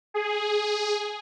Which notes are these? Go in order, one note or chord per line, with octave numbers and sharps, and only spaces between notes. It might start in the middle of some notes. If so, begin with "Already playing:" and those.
G#4